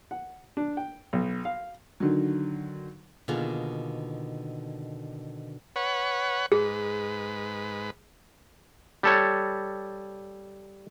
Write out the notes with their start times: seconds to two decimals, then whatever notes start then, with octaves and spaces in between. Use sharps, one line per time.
0.11 F#5
0.57 D4
0.77 G5
1.13 B1
1.45 F5
2.00 D3 D#3 F#3
3.28 B2 D3 D#3 A#3 F4 G#4
5.76 B4 C#5 F#5
6.52 G#2 G#4 B4
9.03 G3 A4 C#5